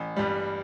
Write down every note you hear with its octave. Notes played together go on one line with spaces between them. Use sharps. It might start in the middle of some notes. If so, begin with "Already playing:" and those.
Already playing: A1
G2 G3